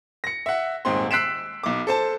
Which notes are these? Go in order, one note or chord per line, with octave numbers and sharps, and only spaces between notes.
A#6 C#7
E5 F#5
D#1 G#2 C4 C6
E6 F#6 B6 C7 D7 E7
B1 D6
A4 C5 A5